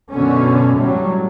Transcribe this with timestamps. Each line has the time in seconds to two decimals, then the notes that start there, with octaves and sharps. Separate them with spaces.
0.11 F#2 B2 D3 C#4
0.78 A2 F#3 G3